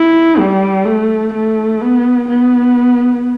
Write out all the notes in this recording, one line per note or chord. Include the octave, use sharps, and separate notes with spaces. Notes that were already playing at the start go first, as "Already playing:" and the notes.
Already playing: E4
G3
A3
A3
B3
B3